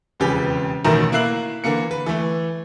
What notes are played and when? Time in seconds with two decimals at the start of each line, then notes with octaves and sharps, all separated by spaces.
0.20 E1 F2 C#3 G4 G#4 B4
0.84 A1 B2 D#3 A3 A#4 A#5
1.12 A#3 E4 F#6 C7 F#7
1.64 D3 E3 A#3 C#7
1.91 B4
2.06 E3 A3